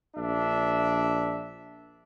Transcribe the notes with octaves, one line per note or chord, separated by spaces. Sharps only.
A#1 D4 E5